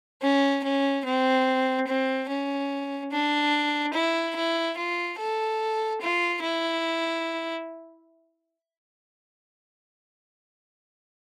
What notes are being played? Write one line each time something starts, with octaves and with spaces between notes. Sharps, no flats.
C#4
C#4
C4
C4
C#4
D4
E4
E4
F4
A4
F4
E4